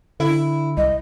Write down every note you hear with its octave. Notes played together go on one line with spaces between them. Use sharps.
D3 E4
C2 D#5